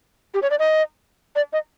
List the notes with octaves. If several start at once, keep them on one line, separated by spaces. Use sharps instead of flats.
G4
C#5
D5
D#5
D5
D#5